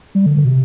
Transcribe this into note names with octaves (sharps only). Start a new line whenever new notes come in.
G3
D3
D3
B2
C3